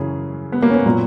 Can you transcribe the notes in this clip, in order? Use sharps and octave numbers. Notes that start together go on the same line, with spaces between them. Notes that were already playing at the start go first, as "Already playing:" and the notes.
Already playing: F#2 C#3 E3 G#4
B3
A#3
C#4
B3
A#2 F#3